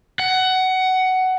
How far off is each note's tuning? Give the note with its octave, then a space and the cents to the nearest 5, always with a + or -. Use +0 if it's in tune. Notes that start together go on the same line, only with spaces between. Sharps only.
F#5 +15